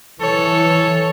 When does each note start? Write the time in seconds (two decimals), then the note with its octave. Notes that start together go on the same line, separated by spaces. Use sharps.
0.21 E3 A4 C#5